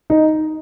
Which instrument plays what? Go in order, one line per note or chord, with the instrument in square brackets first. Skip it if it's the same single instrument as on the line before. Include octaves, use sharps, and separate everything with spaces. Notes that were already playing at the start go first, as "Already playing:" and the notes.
[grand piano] D#4